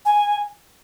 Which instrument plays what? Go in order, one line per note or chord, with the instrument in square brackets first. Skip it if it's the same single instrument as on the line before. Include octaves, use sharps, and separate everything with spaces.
[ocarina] G#5